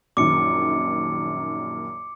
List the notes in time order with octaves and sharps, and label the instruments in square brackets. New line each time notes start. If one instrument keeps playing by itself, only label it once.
[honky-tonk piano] A#1 F#2 D#3 [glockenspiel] D6 C#7